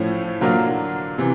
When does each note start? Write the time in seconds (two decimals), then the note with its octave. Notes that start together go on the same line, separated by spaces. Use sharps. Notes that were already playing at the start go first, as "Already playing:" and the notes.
Already playing: A2 F3 A3 C#4 E4
0.41 D3 F#3 A#3 D4 F4
1.18 C3 E3